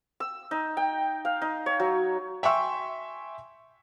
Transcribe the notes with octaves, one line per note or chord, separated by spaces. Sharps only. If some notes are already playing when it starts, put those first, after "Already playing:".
E6
D#4
G5
F5
D#4
C#5
F#3
E5 G5 G#5 C6 C#6 E6